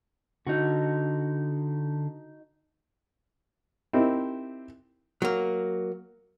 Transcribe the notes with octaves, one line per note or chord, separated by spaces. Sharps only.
D3 D#4 F#4
C4 D#4 E4 G4 A#4
F#3 A#3